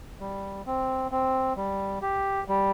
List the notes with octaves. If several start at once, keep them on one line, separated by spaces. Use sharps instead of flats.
G3
C4
C4
G3
G4
G3